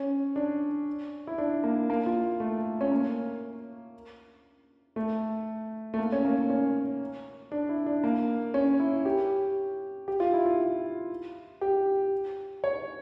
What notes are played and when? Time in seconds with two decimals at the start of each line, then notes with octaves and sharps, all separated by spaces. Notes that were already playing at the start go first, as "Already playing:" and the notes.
Already playing: C#4
0.36 D4
1.27 E4
1.38 D4
1.64 A#3
1.90 A#3
2.06 F4
2.40 A3
2.81 C#4
2.92 A#3
4.96 A3
5.94 A3
5.99 A#3
6.12 C#4
6.25 A#3
6.50 C#4
7.52 D4
7.69 E4
7.86 D4
8.04 A#3
8.54 C#4
8.80 E4
9.05 G4
10.08 G4
10.20 F4
10.34 E4
10.46 F4
11.61 G4
12.64 C#5